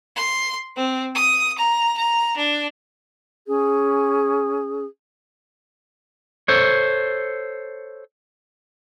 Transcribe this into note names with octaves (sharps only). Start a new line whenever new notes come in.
C6
C4
D#6
A#5
A#5
D4
C#4 G#4
A4 C5 C#5